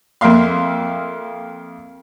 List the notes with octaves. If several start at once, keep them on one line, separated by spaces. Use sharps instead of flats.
F2 A#3 E5 F5 C6